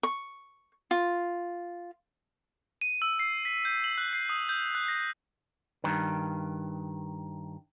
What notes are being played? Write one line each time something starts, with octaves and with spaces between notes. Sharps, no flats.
C#6
F4
D#7
E6
C7
B6
G6
F#7
F#6
C7
D#6
G6
F#6
A#6
G2 D#3